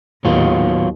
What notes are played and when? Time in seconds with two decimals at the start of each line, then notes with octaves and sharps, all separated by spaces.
0.25 D#2 A2 D#3 F#3 B3 F4